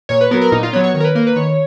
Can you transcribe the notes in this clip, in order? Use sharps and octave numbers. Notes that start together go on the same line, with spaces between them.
A#2 C#5
B4
F#3 B3 A#4
A#4
A#2 D#4
F4
F#3 B3 C#5
C#5
D#3 C#5
A#4
B4
A#3 A#4
B4
D#3 C#5